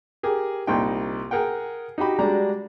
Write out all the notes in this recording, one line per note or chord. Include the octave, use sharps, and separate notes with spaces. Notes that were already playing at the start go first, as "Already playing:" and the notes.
G4 G#4 A#4
C2 A#2 D#4 G5
G#4 A#4 F#5 G5
D#4 F#4 G4 B5
G3 G#3 D4 F#4 A#5